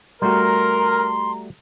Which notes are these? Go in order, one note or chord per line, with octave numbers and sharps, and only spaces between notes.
G3 A3 F#4 A#4 A#5 C6